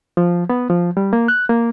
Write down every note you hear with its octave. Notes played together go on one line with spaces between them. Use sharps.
F3
B3
F3
G3
A#3
F#6
A#3